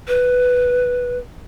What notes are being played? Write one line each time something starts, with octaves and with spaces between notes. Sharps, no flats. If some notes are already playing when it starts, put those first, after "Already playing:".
B4